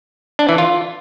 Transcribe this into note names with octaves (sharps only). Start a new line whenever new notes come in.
D4
E3
F4